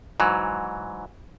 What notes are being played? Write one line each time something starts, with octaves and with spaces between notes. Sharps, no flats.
G#2 E3 F#3